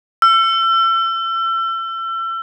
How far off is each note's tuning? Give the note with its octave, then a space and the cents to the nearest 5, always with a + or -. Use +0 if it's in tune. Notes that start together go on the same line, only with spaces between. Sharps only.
E6 +35